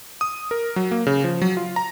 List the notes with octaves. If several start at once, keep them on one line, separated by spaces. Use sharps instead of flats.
D#6
A#4
F#3
A#3
C#3
F3
F#3
F4
A#5